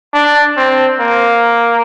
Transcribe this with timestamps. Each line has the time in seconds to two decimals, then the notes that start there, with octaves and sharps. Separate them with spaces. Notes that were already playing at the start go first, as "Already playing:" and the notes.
0.14 D4
0.57 C4
1.00 A#3